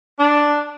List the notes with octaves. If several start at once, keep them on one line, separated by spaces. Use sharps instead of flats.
D4